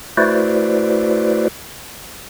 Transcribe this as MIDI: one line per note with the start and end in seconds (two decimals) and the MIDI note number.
0.17 1.48 57
0.17 1.48 64
0.17 1.48 66
0.17 1.48 71
0.17 1.48 72
0.17 1.48 74